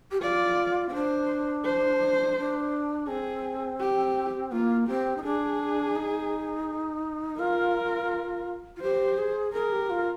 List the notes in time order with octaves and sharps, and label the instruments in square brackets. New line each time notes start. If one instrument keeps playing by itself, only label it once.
[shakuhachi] G4
[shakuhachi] F4 [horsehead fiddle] D5
[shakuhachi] C4
[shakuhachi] D4 [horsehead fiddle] C5
[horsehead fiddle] C5
[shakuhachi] D4
[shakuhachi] C4 [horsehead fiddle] G#4
[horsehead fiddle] G4
[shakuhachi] A#3 [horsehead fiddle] F4
[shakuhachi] C4 [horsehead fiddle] G4
[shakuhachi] D#4
[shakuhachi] D4 [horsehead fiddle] G#4
[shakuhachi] D#4
[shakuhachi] F4 [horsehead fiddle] A#4
[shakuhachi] F4
[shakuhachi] G4 [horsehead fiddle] C5
[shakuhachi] G#4
[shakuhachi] G#4 [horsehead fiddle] A#4
[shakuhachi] G4
F4